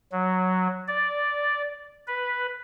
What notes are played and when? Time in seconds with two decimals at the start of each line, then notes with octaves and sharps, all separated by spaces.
0.12 F#3
0.88 D5
2.07 B4